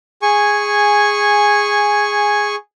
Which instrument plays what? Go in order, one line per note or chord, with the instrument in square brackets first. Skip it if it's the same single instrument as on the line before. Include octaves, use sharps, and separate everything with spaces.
[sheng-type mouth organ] G#4 G#5 C#6